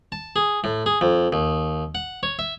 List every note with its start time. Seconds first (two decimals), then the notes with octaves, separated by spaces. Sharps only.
0.12 A5
0.36 G#4
0.64 A2
0.86 G#4
1.01 F2
1.33 D#2
1.95 F#5
2.23 C#5
2.39 E5